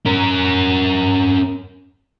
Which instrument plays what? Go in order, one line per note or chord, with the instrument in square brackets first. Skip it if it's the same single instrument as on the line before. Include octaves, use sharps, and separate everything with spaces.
[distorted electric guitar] C#4 A#4